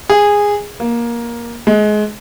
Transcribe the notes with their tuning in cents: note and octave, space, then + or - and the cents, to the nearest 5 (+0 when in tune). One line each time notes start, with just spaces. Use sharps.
G#4 -15
A#3 +15
G#3 +25